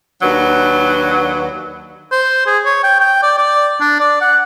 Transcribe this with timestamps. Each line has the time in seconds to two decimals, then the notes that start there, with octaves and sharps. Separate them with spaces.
0.21 D#2 F#3 D4 B4
2.12 C5
2.47 G#4
2.65 C#5
2.84 G5
3.00 G5
3.23 D5
3.38 D5
3.81 D4
4.00 D5
4.21 F#5